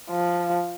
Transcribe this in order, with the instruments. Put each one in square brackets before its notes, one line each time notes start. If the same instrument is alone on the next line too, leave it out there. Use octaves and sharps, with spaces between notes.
[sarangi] F3